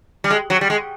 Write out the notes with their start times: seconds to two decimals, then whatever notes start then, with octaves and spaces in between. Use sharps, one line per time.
0.24 G3
0.30 G#3
0.50 F#3
0.61 G3
0.70 G#3